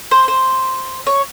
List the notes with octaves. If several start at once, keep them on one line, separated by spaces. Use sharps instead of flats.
C5
C5
C#5